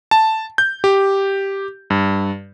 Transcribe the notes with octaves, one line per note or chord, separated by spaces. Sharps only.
A5
G6
G4
G2